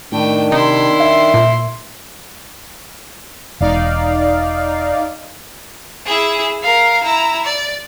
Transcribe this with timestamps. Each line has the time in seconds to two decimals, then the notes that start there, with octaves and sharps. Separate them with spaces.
0.12 A2 D#3 A3 D4 G5
0.52 C3 D#4 E4 C6
1.00 E5
1.34 A#2
3.60 E1 D#4 D5 F5
6.06 E4 G#4
6.62 A#4 F5
7.03 E4 A#5
7.45 D5